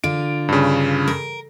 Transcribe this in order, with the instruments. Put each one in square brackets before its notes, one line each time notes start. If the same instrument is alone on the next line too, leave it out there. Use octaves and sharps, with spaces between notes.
[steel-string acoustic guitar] D3 F4 [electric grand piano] D7
[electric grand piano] G2 C#3
[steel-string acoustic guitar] A#4